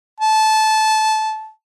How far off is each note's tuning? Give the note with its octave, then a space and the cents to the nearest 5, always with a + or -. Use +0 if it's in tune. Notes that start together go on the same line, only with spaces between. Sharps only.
A5 -20